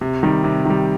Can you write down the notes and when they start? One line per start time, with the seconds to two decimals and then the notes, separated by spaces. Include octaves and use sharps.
0.01 C3
0.23 D#3 G3
0.44 C3
0.65 D#3 G3